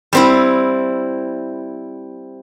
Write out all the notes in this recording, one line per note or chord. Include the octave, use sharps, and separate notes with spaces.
G3 C4 E4